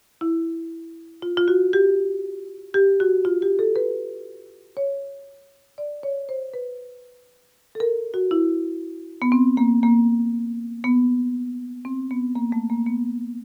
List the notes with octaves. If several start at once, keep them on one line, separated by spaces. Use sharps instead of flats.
E4
F4
F4
F#4
G4
G4
F#4
F4
G4
A4
B4
C#5
D5
C#5
C5
B4
A4
A#4
F#4
E4
B3
C4
A#3
A#3
B3
C4
B3
A#3
A3
A#3
B3